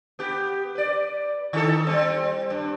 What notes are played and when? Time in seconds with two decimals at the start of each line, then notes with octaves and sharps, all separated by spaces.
0.19 B3 G4
0.75 B4 D5
1.53 D#3 D#4 A4
1.87 G3 C4
2.50 G2